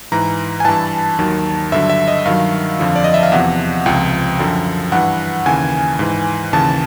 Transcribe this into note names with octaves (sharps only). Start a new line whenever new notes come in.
G#2 E3 A#5
G#5
G2 E3 A5
D#2 D#3 F#3
G2 D3 F#3 E5
E5
D#5
G2 D#3 F#3 F5
F2 D3 F3
D5
D#5
E5
F5
E2 C3 F3 F#5
C#2 C3 F3 G5
F#2 D3 F3
G2 E3 F#5
D#2 C#3 E3 G#5
G#2 E3
D#2 C#3 E3 A5